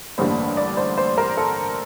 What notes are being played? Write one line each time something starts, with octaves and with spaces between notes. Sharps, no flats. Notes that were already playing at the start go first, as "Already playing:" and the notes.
A1 G2 D3 G3 A#3 C5
D5
C5
C5
A#4
A4